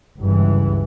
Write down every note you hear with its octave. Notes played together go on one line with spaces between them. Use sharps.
G1 C#2 G2 E3